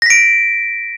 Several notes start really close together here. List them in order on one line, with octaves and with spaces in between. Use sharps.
A#6 B6 D7